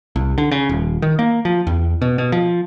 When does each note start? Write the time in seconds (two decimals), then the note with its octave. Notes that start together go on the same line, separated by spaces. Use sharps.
0.16 C2
0.38 D3
0.51 C#3
0.69 D#1
1.02 D#3
1.19 A#3
1.45 F3
1.67 E2
2.02 B2
2.18 B2
2.32 F3